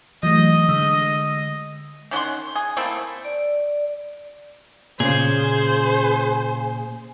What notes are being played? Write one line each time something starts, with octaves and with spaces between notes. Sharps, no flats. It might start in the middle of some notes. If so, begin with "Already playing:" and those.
E3 F#3 A3 D#5
D3 G#3 E6
D#3 C#4 F#5 C6
G#4
A3 A#3 C4 E4
D5
A#2 C#3 G#4 C5